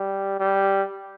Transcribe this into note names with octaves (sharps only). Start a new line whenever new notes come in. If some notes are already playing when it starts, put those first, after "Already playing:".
Already playing: G3
G3